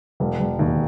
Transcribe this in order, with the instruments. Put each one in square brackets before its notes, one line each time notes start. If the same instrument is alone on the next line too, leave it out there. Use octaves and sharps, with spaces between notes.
[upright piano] E1
E1
D#2